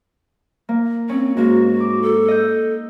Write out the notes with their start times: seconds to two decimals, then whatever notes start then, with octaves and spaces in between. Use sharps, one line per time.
0.69 A#3
1.09 C4 C#4
1.37 G#2 A#3 F#4
1.80 D6
2.03 A4
2.28 D#5 G6